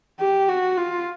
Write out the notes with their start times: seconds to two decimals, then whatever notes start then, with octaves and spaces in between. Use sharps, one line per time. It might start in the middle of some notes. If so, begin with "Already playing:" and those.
0.20 G4
0.49 F#4
0.77 F4